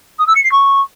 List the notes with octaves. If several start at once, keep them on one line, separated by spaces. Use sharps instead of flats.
D#6
E6
C#7
C7
C#6